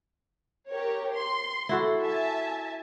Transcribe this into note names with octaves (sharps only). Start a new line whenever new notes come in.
G4 A#4 C#5
C6
E4 F#4 A4
E5 G#5 A5